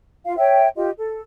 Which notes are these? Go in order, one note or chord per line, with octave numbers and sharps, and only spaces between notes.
F4 F5
C#5 E5 G5
F4 G4 D#5
A4